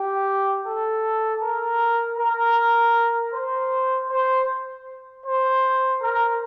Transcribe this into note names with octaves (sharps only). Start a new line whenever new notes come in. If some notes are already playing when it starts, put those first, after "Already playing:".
Already playing: G4
A4
A#4
A#4
C5
C5
C5
A#4